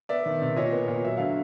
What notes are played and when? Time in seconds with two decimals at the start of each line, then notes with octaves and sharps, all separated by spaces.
0.09 B3 D5 E5
0.26 D#3
0.42 C3
0.56 A#2 C#5 D#5
0.72 B3
0.88 A#2
1.05 F#3 E5
1.17 D3 F5